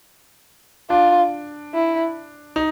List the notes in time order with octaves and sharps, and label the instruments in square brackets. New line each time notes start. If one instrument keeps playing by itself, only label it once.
[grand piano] D4 [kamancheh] F4
[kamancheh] E4
[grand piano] D#4